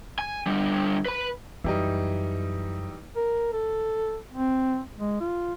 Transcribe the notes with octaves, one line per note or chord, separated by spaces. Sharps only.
G#5
D3 G3
B4 B5
F#2 E3 G3 D#4
A#4
A4
C4
G#3
F4